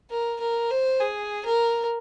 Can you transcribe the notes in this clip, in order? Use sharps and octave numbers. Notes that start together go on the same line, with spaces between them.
A#4
A#4
C5
G#4
A#4